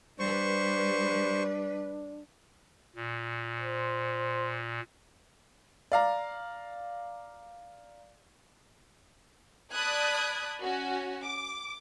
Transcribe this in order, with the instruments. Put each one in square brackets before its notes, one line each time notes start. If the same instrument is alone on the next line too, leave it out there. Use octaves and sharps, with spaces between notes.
[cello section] G3 B4 [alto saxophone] D4 [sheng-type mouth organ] C5 C#6
[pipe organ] A#2
[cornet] C5
[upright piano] D5 F5 A#5
[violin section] D5 A5 B5 D#6 F#6 G#6
C#4 F#4
D6